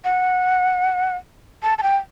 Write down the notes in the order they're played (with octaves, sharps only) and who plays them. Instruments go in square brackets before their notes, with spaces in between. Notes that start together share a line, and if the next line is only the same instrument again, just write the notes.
[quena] F#5
A5
A5
G5